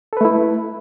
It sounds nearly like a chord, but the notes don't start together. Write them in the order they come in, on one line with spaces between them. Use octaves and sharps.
A4 B4 A3 E4